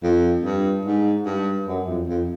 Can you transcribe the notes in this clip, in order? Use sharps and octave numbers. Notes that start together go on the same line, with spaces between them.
F2
G2
G#2
G2
F#2
F2
F2